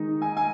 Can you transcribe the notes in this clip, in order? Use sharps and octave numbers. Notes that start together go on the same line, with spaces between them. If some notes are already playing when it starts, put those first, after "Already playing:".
Already playing: D#3 G#3 D#4
G#5
G#5